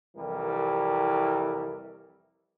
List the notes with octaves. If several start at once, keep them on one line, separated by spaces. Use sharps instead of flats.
C2 F2 E3 G3 E4 A#4